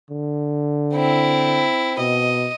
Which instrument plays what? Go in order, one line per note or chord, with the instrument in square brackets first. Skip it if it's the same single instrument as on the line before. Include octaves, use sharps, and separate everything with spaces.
[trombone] D3
[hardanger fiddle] C4 E4
[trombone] B2 [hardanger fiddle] D#5